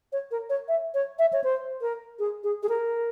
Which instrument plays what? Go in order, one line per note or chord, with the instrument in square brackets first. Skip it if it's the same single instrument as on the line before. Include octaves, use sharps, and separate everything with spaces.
[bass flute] C#5
A#4
C#5
E5
C#5
E5
C#5
C5
A#4
G#4
G#4
G#4
A#4